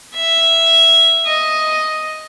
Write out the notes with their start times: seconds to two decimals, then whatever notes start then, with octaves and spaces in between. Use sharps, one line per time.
0.15 E5
1.27 D#5